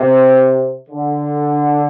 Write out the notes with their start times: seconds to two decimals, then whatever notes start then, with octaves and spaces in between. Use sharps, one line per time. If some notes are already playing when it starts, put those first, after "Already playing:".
Already playing: C3
0.90 D3